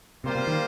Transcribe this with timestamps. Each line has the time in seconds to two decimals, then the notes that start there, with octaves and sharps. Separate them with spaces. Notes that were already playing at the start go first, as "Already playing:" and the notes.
0.24 C3 G3 A#3 F4 C5
0.35 C3
0.47 D#3